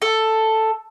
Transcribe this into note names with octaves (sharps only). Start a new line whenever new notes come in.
A4